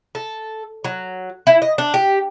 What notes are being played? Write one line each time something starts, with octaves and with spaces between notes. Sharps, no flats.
A4
F#3
E4
D#5
D4
G4